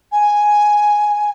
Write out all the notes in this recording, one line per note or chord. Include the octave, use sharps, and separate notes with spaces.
G#5